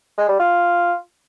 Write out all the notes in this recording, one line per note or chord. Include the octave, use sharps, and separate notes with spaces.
G#3
G3
F4